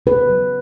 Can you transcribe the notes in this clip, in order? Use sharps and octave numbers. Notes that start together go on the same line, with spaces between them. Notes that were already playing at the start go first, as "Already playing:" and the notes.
C#3 B4
F#3